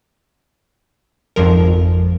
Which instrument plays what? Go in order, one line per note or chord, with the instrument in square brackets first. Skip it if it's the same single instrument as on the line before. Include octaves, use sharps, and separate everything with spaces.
[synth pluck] G#1 F2 F3 A#4